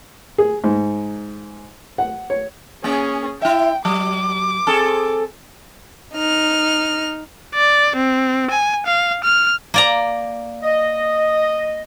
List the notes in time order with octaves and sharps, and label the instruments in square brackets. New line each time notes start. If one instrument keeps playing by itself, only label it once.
[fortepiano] G#4
G#2
F#5
C#5
[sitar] A#3 [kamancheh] C#4 G#4
[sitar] E4 E5 [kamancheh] G5
[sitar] F#3 [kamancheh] D6
[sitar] C4 G#4 A4
[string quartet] D#4 F6
[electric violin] D5
C4
G#5
F5
F6
[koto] A#3 D5 A#5
[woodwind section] D#5